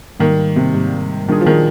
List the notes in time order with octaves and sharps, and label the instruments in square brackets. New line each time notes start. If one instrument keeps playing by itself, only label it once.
[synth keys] G#2 G3 A#3 [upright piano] D#3
[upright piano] C3
[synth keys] G#2 G3 A#3
[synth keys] A#2 G3 D4 F4 G#4 [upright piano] D#3
[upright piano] F3
D#3